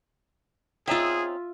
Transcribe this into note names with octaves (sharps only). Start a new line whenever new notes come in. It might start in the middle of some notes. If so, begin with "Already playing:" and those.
C4 C#4 D#4 F4 G#4 E5